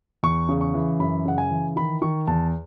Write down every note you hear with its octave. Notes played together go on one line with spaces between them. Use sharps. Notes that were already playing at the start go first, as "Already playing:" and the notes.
E2 C#6
C#3
C#6
E3
F#2 B5
C#3 F#5
G#5
E3
D#3 B5
D#3 C#6
E2 A5